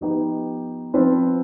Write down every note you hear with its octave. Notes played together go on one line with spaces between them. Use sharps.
F3 B3 D#4 G4 B4
F3 C4 F4 B4